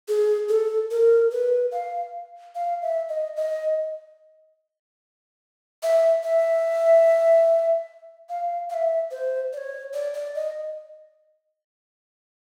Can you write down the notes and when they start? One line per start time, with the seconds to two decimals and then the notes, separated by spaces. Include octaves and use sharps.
0.08 G#4
0.49 A4
0.91 A#4
1.32 B4
1.72 F5
2.55 F5
2.82 E5
3.09 D#5
3.36 D#5
5.83 E5
6.24 E5
8.29 F5
8.70 F5
8.74 E5
9.11 C5
9.53 D5
9.58 C#5
9.94 D5
10.14 D5
10.35 D#5